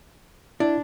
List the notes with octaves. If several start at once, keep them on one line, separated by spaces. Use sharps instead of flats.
D4 E4